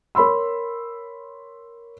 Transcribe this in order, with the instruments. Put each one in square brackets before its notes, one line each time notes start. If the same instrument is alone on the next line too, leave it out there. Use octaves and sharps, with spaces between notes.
[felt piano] A#4 C#5 B5 C6 E6